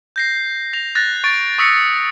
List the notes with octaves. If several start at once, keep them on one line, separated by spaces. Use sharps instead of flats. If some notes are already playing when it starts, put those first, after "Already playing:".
G6 A#6 C7
A#6 F7
F#6 A6 A#6
C#6 A6 D7
C#6 D#6 E6 A#6 B6 C#7